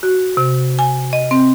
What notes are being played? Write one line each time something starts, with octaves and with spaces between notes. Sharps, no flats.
F#4
C3
G#5
D#5
C4